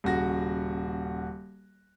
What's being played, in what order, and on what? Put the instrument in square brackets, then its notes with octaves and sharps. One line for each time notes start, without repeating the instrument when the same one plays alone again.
[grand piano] D#1 C#3 F#4 A#6